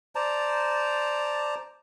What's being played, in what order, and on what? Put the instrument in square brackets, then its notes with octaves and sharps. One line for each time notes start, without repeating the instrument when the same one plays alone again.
[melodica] C5 D5 A5 A#5